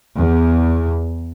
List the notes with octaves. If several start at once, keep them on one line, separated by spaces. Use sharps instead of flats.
E2